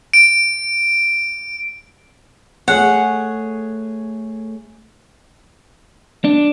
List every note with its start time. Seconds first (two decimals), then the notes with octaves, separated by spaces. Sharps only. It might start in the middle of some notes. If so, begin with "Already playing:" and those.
0.14 D7
2.68 A3 G#4 C#5 F#5
6.24 D4